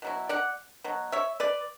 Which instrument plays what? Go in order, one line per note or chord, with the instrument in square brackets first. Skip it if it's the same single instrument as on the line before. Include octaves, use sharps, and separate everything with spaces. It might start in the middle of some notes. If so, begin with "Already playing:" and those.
[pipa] B2 F#3 E4
D5 F#5
B2 F#3
C#5 E5
B4 D5